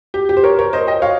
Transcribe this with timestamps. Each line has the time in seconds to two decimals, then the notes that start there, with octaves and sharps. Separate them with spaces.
0.14 G4
0.29 G4
0.37 C5
0.43 A#4 C#5
0.59 A#4 C#5
0.73 C5 D#5
0.87 D#5 G5
1.02 C#5 F5